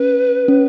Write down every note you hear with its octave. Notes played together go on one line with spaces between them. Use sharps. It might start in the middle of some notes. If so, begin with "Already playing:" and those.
Already playing: C#4 B4
C#4